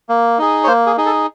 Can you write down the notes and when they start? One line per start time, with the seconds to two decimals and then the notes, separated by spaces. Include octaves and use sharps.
0.09 A#3
0.38 D#4 G#4
0.64 C#5
0.67 A#3 C5
0.86 G#4
0.97 D#4 G#4
1.06 A4